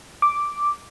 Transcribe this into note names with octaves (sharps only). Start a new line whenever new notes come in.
D6